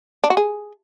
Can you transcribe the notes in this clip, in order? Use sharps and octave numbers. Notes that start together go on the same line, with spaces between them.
D4
F#4
G#4